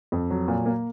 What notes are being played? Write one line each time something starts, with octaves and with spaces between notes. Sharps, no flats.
F2
F#3
A#2
A#3